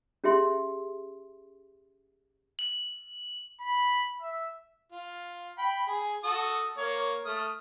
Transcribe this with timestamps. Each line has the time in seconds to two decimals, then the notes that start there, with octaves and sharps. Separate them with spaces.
0.24 C#4 G4 G#4 E5 C6
2.59 F#7
3.61 B5
4.21 E5
4.92 F4
5.58 G5 B5
5.87 G#4
6.24 F#4 A4 D#6
6.77 A#3 C#5
7.25 A3 D#6 F6